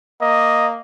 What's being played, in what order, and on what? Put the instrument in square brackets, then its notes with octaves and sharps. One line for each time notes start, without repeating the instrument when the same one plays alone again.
[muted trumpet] A#3 [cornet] D#5